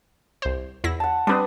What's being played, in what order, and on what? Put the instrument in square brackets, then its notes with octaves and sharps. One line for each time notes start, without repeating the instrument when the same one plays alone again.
[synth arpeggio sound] C2 C5
E2 E4 A#6
[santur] F#5 A5
[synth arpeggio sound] G3 C4 [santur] D4 B4 D#5